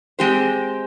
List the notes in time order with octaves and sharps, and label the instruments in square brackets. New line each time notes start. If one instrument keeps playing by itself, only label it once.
[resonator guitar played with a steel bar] G#3 C4 G4 C5